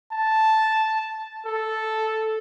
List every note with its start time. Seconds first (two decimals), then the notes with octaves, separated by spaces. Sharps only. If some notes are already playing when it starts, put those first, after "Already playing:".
0.12 A5
1.46 A4